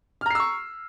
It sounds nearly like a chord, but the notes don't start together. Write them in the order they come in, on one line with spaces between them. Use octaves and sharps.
F6 A#5 C7 E6 C#6